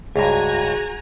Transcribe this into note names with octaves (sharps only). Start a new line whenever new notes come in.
C#2 G2 F#4 G#4 G#5 A#5